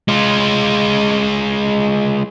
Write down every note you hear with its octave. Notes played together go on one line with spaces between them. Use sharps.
G#3 F4